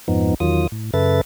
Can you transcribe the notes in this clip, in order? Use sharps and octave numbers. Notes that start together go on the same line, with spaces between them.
F2 G#2 F3 B3 D#4
E2 D#3 F#3 F4 D#6
A2
F#2 C#3 A4 B4 E5 A6